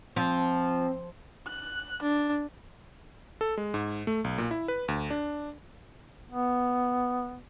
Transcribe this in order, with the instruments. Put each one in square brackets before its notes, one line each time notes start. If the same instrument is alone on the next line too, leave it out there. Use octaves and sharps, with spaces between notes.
[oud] F3 [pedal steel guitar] C4
[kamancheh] F#6
D4
[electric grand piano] A4
G#3
G#2
A3
B1
A#2
E4
B4
D2
D4
[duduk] B3